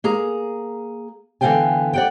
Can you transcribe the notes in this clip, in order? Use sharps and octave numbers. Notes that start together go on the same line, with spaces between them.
A#3 G#4 A#5
D3 E3 B3 F5 G5 G#5
D5 F#5 G5